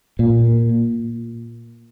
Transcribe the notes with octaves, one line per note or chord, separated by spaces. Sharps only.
A#2